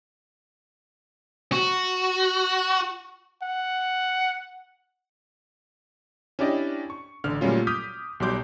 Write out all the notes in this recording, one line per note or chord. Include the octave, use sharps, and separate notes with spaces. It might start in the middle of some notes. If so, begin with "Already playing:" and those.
F#4
F#5
C#4 D4 E4 G4 D5 D#5
C#6
A1 D3 F6
A#2 F#3 G3 A3 C#4 F4
D6 D#6 F6 G6 B6
B1 F#3 G3 C6 D6 G6